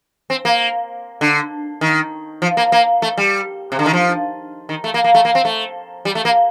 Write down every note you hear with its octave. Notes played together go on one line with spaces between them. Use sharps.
C4
A#3
D3
D#3
F3
A#3
A#3
A3
G3
C3
D3
D#3
F3
D#3
A3
A#3
A#3
A3
A#3
C4
A3
G3
A3
A#3